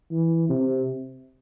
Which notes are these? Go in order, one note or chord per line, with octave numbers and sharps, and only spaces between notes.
E3
C3